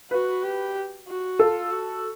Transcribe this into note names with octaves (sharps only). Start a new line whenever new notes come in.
F#4 B4
G4
F#4
F4 A4
F#4